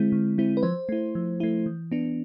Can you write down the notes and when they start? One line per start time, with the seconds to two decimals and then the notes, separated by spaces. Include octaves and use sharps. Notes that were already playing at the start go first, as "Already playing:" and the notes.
Already playing: D3 G#3 C4 E4
0.12 D3
0.38 G#3 C4 E4
0.57 B4
0.63 F3 C5
0.89 A3 E4
1.15 F3
1.40 A3 E4
1.66 E3
1.92 B3 D4